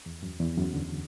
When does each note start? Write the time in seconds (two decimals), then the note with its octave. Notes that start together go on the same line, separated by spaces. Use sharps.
0.06 E2
0.23 F#2
0.40 E2
0.57 F#2
0.73 D2 D3